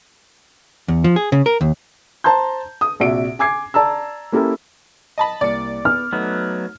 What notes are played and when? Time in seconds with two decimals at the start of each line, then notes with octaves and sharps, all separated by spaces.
0.88 E2
1.04 F3
1.16 G#4
1.32 C#3
1.46 A#4
1.61 D#2
2.24 C5 A5 A#5 C6 G6
2.81 D#6
3.00 A#1 C3 F#4 D5 E5 D7
3.39 G#5 D6 G#6 C7
3.74 D5 A5 A#5 E6
4.32 A#3 C#4 E4 G4 A4 A#4
5.18 D#5 A5 B5
5.41 C2 A#3 D5 C#7
5.85 B3 F6
6.13 F#3 A3 B3 D#4